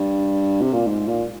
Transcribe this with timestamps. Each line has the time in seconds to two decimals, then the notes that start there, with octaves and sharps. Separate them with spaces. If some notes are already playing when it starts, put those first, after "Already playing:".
Already playing: G2
0.62 C3
0.73 A#2
0.87 G#2
1.08 A#2